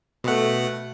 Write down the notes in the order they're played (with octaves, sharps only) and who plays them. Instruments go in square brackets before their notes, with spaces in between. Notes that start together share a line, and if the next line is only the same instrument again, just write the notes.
[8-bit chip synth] B2 F#5 [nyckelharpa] A3